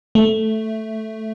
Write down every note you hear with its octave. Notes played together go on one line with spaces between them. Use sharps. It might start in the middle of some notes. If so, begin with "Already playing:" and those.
A3